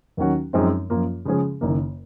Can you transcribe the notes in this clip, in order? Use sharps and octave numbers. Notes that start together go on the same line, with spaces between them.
D#2 D#3 F#3 C#4 F#4
F#2 F3 G#3 C4 D#4
F#2 F3 A#3 F4
C#3 F3 G#3 C#4 G#4
F#1 F#2 D#3 A#3